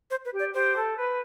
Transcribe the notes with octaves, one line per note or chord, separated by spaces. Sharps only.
C5
B4
G4
D5
G4 C5
A4
B4